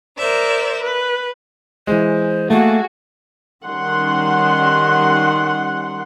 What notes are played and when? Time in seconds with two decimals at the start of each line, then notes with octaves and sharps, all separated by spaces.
0.18 A#4 C5 D5 E5
0.82 B4
1.87 E3 G#3 C5
2.50 A3 A#3 F#4 G#4
3.65 D#3 G3 C#4 F#5 C6